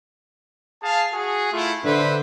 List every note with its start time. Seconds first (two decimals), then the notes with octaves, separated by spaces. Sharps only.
0.83 G#4 F5 A5
1.13 F#4 G#4
1.53 A3 E4 F4
1.84 D3 B4 C5 E5